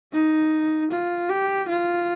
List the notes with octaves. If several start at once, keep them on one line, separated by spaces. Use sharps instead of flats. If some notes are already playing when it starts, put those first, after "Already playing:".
D#4
F4
G4
F4